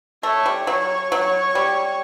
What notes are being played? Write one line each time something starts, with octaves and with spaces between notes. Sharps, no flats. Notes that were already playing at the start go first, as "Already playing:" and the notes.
A3 C#5
G3
F#3 C#5
F#3
G3